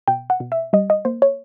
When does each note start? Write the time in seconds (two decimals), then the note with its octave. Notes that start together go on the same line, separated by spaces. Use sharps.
0.08 B2 G5
0.30 F#5
0.40 B2
0.52 E5
0.73 G3 D#5
0.90 D#5
1.05 A#3 C5
1.22 C#5